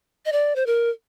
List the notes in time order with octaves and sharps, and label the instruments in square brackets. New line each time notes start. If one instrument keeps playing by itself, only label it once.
[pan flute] D#5
D5
C5
A#4